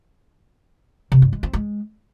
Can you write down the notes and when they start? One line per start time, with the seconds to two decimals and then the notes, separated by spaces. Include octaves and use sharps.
1.12 C3
1.22 G2
1.33 G#3
1.43 C4
1.53 G#3